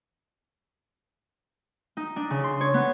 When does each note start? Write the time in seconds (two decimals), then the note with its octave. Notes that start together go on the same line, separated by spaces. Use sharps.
1.97 D#4
2.16 D4
2.30 C#3
2.44 C6
2.61 C#5
2.74 B3